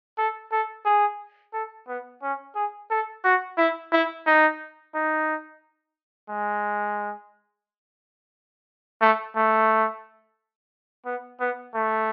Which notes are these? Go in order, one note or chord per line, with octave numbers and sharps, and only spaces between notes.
A4
A4
G#4
A4
B3
C#4
G#4
A4
F#4
E4
E4
D#4
D#4
G#3
A3
A3
B3
B3
A3